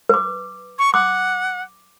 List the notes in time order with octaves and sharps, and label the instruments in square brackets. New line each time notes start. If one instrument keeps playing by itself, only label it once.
[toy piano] B4 D6
[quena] C#6
[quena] F#5 [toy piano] D6